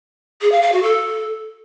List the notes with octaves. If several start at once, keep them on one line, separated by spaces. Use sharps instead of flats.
G#4
F5
F5
F#4
A4